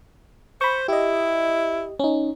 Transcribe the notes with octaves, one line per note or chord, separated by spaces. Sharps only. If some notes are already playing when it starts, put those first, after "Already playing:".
C5 B5 C#6
E4 G4 D#5
C#4 D#4